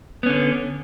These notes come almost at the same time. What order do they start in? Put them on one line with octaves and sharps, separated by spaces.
B3 C#4 D3